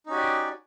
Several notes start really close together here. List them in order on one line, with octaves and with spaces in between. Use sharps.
D#4 C#4 F#4 G4 D5